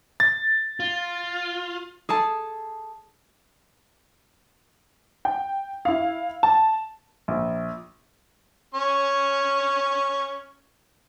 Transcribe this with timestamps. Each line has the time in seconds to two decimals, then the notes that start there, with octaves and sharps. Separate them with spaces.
0.20 A6
0.80 F4
2.09 G#4 A4 A5
5.25 G5
5.85 E4 F5
6.43 A5
7.28 A#1
8.74 C#4 C#6